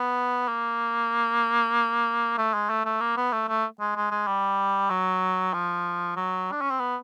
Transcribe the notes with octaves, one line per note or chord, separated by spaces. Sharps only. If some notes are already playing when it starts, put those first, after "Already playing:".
Already playing: B3
A#3
A3
G#3
A3
A3
A#3
B3
A3
A3
G#3
G#3
G#3
G3
F#3
F3
F#3
D4
C#4
C4
B3